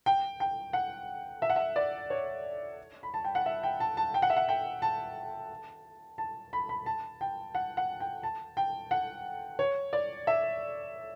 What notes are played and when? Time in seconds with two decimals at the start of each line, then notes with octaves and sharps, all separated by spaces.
0.06 G5
0.40 G5
0.73 F#5
1.42 E5
1.50 F#5
1.56 E5
1.76 D5
2.10 C#5
3.03 B5
3.14 A5
3.24 G5
3.35 F#5
3.46 E5
3.63 G5
3.80 A5
3.97 A5
4.14 G5
4.22 F#5
4.30 E5
4.37 F#5
4.49 G5
4.82 A5
6.18 A5
6.53 B5
6.69 B5
6.86 A5
7.21 G5
7.55 F#5
7.77 F#5
8.00 G5
8.23 A5
8.57 G5
8.91 F#5
9.59 C#5
9.93 D5
10.27 E5